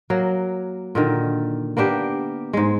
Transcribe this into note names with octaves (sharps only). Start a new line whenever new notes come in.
F#3 A#3
A#2 D3 D#3
A#3 B3 D4 G4
G#2 G#3